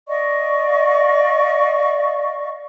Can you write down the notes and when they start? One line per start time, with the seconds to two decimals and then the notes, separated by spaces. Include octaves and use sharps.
0.08 D5 D#5 F5 C#6